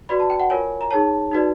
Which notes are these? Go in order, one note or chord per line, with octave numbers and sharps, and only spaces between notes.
F#4 B4 D5 B5
A5
G5
F#5
F4 A#4 C#5 G#5
A#5
D#4 G#4 C#5 A5
D#4 F#4 B4 D5